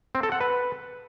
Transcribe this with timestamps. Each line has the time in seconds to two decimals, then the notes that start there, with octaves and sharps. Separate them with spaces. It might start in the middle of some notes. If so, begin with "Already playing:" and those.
0.15 C4
0.23 A4
0.32 F#5
0.40 B4